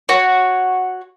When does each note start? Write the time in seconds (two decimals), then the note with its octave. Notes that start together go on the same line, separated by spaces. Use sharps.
0.09 F#4 C#5